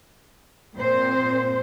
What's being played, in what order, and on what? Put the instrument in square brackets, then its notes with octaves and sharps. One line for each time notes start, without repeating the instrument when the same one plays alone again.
[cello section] A#2 C4 C5